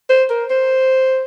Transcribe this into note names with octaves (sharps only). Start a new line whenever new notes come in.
C5
A#4
C5